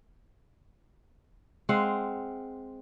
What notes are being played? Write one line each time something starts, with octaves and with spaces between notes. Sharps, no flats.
G#3 C4 F5 F#5